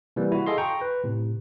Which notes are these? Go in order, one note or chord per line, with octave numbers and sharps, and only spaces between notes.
C3 E3 G3 A#3
E4 F#4
G#4 A4 D#5 F5 C6
G5 A#5 C#6
B4
A2 C3